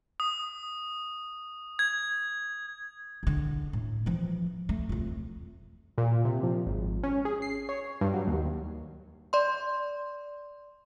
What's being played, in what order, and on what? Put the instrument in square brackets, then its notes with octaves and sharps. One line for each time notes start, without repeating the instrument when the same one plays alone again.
[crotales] D#6
G#6
[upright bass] E2 D3
A2
E3 F3
A3
F2 F4
[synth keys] A#2
C3
F3
G#1
C#4
G#4
C7
C#5
G2
F#3
D#2
[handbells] D5 C6